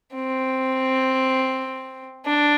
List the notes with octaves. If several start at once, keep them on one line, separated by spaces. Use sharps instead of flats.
C4
D4